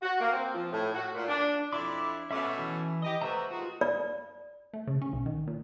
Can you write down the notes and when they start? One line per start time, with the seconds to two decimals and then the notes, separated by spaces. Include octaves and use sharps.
0.01 F#4
0.19 A#3
0.32 C4
0.54 F3
0.72 A2
0.94 F#4
1.15 A#2
1.27 D4
1.72 F2 D4 E4 B5 C6 D6
2.31 B2 A3 C#4 E5 B5 D6
2.59 E3
3.03 G4 D#5
3.22 A3 F#4 B4 C5 E5 A#5
3.50 D#2 G#3 F4 F#4
3.81 D5
4.73 A3
4.87 C#3
5.02 C#4
5.13 B1
5.26 D#3
5.47 A#2